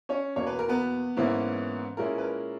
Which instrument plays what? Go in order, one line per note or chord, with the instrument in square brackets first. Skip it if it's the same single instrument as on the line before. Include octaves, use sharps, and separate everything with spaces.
[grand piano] C#4 C#5
E2 B2 A#3 C#5
B4
A#4
B3 B4
G#2 E3 A#3 C#4 E4
A#2 G#3 C#4 E4 A#4
B4
A#4